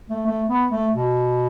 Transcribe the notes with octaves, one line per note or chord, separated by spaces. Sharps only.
A3
A3
B3
A3
B2